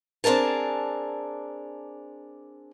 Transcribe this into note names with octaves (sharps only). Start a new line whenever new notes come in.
C4 D4 G#4 A#4 A5